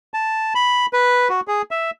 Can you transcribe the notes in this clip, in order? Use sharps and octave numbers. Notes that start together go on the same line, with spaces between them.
A5
B5
B4
F#4
G#4
E5